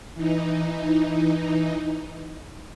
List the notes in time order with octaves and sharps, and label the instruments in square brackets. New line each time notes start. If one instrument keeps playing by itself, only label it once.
[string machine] E3 D#4